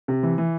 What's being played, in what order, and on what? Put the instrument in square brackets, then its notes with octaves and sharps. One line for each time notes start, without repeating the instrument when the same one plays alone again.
[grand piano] C3
E3
E3